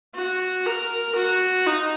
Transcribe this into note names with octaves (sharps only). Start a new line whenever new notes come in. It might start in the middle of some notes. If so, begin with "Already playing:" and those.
F#4
A#4
F#4
D#4